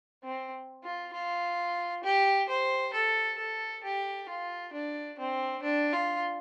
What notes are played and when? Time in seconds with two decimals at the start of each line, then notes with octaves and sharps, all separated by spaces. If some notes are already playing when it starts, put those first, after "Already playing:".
0.24 C4
0.84 F4
1.13 F4
2.04 G4
2.48 C5
2.93 A4
3.38 A4
3.83 G4
4.28 F4
4.73 D4
5.18 C4
5.63 D4
5.93 F4